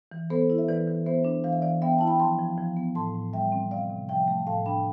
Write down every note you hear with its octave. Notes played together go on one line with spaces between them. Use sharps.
E3
B3 A4 C5
E4
E5
E3 B4 D5
E3
B3 C5 E5
D4
E3 F5
E5
E3 D5 F5
B3 E5 G5
E4 A5
G5 B5
F3 A5 C6
F3
F3
B3
A2 A5 C6
A2
G3 E5 G5
C4
C3 D5 F5
C3
F3 E5 G5
A3
A2 F5 A5
D4 G5 B5